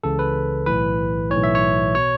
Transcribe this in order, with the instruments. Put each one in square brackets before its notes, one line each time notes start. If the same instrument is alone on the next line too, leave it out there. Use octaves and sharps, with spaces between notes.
[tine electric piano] C#2 C#3 E3 A4
B4
B1 A2 E3 B4
B1 A2 E3 C#5
E5
C#5
B2 C#5